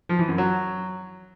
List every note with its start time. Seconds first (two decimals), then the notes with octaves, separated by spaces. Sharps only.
0.09 F3
0.19 E3
0.29 F#2
0.38 F#3